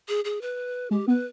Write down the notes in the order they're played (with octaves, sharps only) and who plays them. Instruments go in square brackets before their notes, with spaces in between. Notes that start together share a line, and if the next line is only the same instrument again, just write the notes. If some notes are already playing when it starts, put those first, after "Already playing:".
[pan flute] G#4
G#4
B4
[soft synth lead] G#3 [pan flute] G4
[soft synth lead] B3 [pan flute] B4